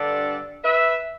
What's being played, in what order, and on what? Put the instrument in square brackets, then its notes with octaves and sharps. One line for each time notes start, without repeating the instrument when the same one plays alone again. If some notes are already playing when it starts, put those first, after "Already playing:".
Already playing: [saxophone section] G2 D3 G3 D4 A4 D5
B4 E5